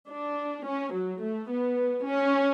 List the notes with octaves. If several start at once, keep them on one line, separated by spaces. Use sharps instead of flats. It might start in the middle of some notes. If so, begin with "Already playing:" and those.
D4
C#4
F#3
A3
B3
C#4